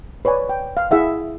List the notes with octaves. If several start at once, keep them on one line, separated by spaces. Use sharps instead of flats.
B4 C#5 D5 G#5
G5
F5
E4 G#4 E5 F#5